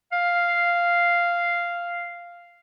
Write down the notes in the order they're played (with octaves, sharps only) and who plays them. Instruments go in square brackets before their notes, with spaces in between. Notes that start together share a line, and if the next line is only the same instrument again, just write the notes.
[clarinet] F5